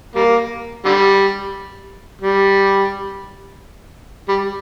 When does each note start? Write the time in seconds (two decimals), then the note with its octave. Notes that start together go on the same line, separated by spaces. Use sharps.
0.15 G3 A#3
0.85 D3 G3
2.22 G3
4.28 G3